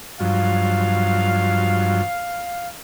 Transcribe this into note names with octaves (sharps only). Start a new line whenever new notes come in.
G2 F3 F#3 F5